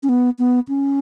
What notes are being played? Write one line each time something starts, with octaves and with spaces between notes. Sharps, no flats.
C#4
B3
B3
C#4